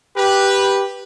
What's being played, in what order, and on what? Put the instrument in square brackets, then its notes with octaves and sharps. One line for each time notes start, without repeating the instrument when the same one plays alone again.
[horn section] G4 B4